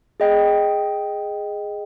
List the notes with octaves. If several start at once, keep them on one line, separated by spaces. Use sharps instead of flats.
G#4 D#5 G5